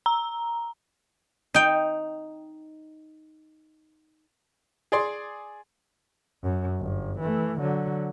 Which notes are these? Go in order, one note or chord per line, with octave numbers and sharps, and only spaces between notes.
A#5
D#4 G5
G#4 D5 C6
F#2
G1
E3 A3
D3 F#3